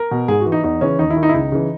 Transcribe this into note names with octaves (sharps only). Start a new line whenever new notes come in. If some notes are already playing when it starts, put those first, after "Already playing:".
Already playing: A#4
B2
G#2 G#4
F#4
E3
D#4
E2 D#4
C#3 E3 C#4
D#2 D#4
E4
D#3
D#4
E4
C#2 D#4
C#3 E3